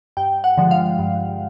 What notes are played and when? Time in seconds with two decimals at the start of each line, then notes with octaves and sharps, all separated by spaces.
0.17 G2 G5
0.44 F#5
0.58 D3 F3 G#3
0.71 F5
0.99 G2